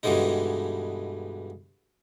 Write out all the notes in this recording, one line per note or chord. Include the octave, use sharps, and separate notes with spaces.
G2 B2 D3 E3 G#3 D#4